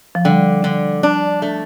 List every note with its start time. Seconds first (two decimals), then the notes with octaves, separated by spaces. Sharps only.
0.15 F3
0.25 D3 G3
0.64 D3
1.03 D4
1.42 A3